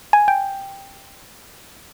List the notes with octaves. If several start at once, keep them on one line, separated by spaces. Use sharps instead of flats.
G#5
G5